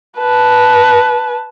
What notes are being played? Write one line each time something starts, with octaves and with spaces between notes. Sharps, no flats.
B4 A5